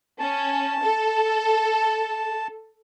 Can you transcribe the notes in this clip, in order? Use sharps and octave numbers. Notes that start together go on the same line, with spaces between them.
C#4 A5
A4